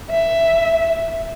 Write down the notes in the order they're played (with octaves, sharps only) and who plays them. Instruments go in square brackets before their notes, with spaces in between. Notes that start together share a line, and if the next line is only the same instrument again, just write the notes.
[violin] E5